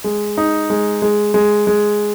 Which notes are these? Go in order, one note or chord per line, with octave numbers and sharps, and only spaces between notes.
G#3
D#4
G#3
G#3
G#3
G#3